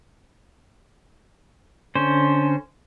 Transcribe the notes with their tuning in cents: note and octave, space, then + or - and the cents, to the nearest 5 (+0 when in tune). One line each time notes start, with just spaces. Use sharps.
D3 -15 C#4 +0 C5 +0